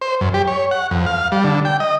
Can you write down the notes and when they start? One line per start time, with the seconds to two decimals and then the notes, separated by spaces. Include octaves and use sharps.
0.01 C5
0.21 F#2
0.34 G4
0.48 C#5
0.71 F#5
0.91 F2
1.06 F5
1.32 G3
1.44 D3
1.65 G5
1.80 D#5